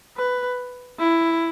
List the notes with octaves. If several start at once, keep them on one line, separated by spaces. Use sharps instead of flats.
B4
E4